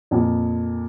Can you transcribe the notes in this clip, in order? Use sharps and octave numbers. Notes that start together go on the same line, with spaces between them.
F2 A#2